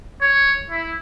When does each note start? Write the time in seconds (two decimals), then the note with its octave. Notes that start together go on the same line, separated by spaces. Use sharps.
0.21 C#5
0.70 E4